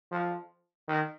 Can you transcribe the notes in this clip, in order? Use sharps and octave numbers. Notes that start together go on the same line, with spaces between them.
F3
D#3